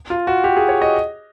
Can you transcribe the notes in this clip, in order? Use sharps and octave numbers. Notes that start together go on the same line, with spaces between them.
F4
F#4
G4
G#4
C#5
D#5